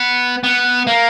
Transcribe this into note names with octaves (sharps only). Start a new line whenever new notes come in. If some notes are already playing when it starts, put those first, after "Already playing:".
Already playing: B3
B3
A#3